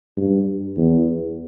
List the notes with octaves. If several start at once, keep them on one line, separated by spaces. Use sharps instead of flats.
G2
E2